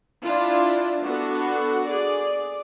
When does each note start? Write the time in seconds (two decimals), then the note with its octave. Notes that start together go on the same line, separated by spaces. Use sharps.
0.25 D4 E4 F4
1.03 B3 D4 F#4 A4
1.88 G#4 D5